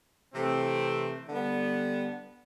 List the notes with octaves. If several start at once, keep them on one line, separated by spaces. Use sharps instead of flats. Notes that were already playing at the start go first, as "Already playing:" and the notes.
C3 E3 A3 C4
D3 G3 B3